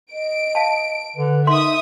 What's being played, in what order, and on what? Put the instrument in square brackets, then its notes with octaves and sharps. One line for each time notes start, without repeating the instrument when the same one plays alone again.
[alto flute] D#5 [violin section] D7
[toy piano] E5 F5 A5
[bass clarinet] D3 [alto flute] B4
[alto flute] D#4 [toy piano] A#4 C6 [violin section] E5 D#6